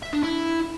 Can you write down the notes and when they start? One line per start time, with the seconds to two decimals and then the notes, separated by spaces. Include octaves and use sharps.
0.03 E5
0.13 D4
0.23 E4